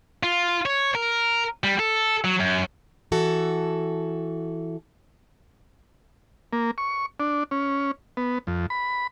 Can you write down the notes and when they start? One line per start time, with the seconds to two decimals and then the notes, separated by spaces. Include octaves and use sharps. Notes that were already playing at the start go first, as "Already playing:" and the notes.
0.23 F4
0.66 C#5
0.95 A#4
1.64 G3
1.79 A4
2.24 F#3
2.40 F#2
3.12 E3 F#4 A4
6.53 A#3
6.78 C#6
7.20 D4
7.51 C#4
8.17 B3
8.47 F2
8.70 B5